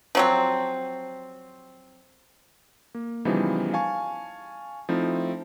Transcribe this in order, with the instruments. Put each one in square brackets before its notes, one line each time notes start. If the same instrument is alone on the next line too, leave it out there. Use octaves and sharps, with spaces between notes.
[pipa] F3 F#3 C4
[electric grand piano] A#3
C#3 E3 F3 G3 B3 D#4
F5 G#5 A5 C#6
F3 A3 C4 D#4 E4